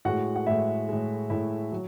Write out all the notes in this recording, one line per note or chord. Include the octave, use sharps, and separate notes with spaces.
A2 G#3 F#4 F#5
F#5
A2 G#3 E4 E5
A2 G#3
A2 G#3 E4 E5
F#3